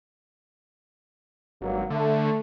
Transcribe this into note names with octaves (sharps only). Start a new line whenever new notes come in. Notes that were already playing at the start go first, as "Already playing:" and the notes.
G#1 G2 F#3 A#3
D3 A3